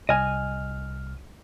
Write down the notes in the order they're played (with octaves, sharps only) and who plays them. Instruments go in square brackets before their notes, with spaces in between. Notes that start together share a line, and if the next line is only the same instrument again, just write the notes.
[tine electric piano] C2 F6 [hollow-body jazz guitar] D#5 G#5